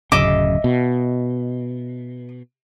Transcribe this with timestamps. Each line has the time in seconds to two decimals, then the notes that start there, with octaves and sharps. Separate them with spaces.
0.12 D1 F#2 C#3 D#5 E5 D6
0.64 B2